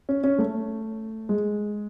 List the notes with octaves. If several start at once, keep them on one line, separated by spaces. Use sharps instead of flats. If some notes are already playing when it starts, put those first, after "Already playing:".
C#4
C#4
A3
G#3